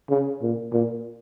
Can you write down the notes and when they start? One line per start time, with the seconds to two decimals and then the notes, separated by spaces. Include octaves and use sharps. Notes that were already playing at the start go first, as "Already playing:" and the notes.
0.10 C#3
0.42 A#2
0.72 A#2